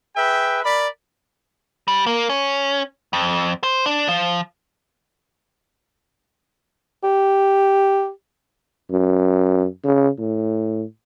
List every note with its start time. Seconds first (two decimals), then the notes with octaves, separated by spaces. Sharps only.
0.16 G#4 B4 E5 G5
0.63 A#4 D5 B5
1.88 G3
2.06 A#3
2.29 C#4
3.13 F2
3.63 C5
3.86 D4
4.09 F3
7.04 G4
8.91 F#2
9.85 C#3
10.19 A2